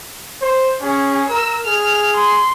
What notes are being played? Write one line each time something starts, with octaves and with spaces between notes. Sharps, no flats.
C5
C#4 G#4
A#4 E6
G#4 F6
C6